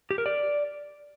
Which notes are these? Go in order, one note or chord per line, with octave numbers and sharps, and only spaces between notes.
G4
A#4
D5